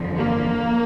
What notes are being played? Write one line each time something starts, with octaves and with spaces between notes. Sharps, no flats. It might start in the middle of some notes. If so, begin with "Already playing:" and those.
Already playing: G1 F2 D3 F3
A#3